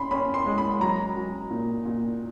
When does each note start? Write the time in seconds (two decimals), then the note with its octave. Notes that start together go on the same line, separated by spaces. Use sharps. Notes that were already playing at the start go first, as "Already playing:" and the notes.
Already playing: C#4 B5 C6
0.11 C#4 B5
0.34 C6
0.46 G#3
0.58 B5
0.81 F#3 A#5
1.15 F#3
1.51 A#2
1.85 A#2